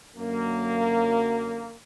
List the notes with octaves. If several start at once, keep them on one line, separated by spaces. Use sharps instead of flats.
F#2 D3 F#3 A#3